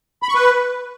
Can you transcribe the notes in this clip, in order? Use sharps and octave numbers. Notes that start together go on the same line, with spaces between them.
B5
C#6
B4